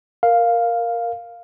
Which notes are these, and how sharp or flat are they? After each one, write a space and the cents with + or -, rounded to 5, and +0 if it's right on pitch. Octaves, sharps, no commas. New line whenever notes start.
A#4 +0 F5 +0